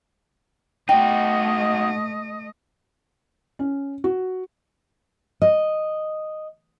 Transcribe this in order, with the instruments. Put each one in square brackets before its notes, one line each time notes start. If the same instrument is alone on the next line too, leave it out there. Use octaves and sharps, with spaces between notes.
[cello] A3 D#5 [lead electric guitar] D#4 F#4 [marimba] G5
[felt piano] C#4
F#4
[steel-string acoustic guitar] D#5